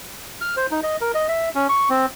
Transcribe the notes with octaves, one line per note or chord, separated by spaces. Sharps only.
F6
C5
D#4
D#5
A#4
D#5
E5
C#4
C#6
C4